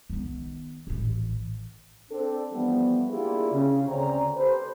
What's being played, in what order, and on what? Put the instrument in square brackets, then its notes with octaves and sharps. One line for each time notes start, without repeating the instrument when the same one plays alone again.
[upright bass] D#3 B3
A1 E3
[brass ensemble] C4 D4 A4
E3 F3 G3 A3 B3
A#3 D4 E4 F4 G4 G#4
C#3
D2 D3 C4 C#4 D5 A#5
G4 A4 B4 C5